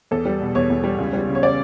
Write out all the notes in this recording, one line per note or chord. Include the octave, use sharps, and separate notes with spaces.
E2 A4
G3
B2
E2 C#5
E2
G3
C#2
G3
C#3
C#5
D5